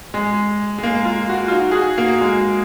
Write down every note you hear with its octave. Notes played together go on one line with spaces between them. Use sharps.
G#3
G#3
A#3
F4
F#4
F4
D#4
G#4
F#4
A#3
G#3